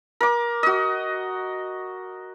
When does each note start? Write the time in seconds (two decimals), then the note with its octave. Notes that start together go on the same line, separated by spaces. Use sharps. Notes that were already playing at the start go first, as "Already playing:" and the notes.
0.21 A#4 D6
0.63 F#4 D#5